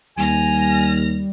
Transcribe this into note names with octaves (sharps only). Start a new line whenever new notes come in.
D#2 G3 G#5 F6 A#6